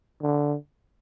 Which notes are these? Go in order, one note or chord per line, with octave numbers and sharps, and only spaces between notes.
D3